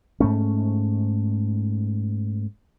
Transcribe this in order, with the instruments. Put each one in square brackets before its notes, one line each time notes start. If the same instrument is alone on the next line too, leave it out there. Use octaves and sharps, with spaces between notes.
[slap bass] G#2 A3 C#4